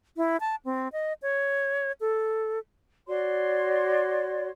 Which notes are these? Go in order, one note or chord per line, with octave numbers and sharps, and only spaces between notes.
E4
A5
C4
D#5
C#5
A4
F#4 C#5 D5 C6